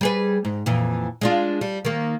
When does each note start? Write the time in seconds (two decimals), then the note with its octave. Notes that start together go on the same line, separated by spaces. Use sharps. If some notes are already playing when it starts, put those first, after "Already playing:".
0.01 G3 G#4 B4
0.45 G#2
0.66 F2 A#2 E3
1.21 G#3 D4 F4
1.61 G3
1.85 D#3 A#3